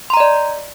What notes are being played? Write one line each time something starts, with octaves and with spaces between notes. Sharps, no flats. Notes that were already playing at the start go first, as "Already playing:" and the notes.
D5 D#5 A#5 C6